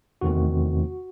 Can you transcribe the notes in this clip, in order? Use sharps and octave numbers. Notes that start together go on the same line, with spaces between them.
E2 C3 D#3 A3 C4 F#4